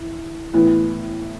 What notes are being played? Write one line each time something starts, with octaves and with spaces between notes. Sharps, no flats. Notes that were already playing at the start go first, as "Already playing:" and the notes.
Already playing: E3
A2 E3 B3